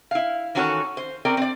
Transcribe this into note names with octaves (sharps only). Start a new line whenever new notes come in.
E4 F5
D#3 E3 C#4 F#4 A4 C#5
C5
C4 C#4 A#4 D5 G5
C4 D5